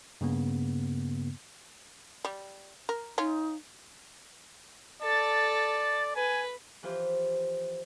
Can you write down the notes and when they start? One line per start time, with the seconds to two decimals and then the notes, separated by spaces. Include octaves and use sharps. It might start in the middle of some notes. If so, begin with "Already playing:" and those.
0.21 G2 C#3 A#3 B3
2.25 G3
2.89 A#4
3.18 C#4 D#4 F4
5.02 A4 D5 A6
6.16 B4 G#5
6.83 E3 F3 F4 G4 C5